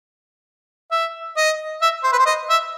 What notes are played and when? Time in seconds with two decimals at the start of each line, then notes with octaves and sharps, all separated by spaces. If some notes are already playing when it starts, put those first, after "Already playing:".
0.91 E5
1.37 D#5
1.82 E5
2.04 C5
2.12 B4
2.19 C5
2.26 D#5
2.50 E5